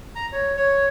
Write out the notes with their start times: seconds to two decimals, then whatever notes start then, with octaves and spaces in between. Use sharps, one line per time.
0.15 A#5
0.32 C#5
0.57 C#5